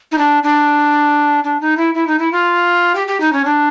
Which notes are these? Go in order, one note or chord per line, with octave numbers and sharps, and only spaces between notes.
D#4
D4
D4
D4
D#4
E4
E4
D#4
E4
F4
G4
G4
D#4
C#4
D4